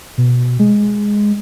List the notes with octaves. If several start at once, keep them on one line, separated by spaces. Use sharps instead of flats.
B2
G#3